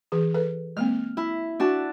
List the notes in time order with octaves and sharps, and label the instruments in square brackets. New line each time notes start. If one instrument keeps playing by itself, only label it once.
[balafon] E3 G#4
A4 B4
[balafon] G#3 A#3 C4 [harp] F6
[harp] E4
D4 F#4 A5